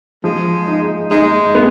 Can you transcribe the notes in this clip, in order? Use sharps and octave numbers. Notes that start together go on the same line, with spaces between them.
F3 G#3
D#4
G#3 D#4
B3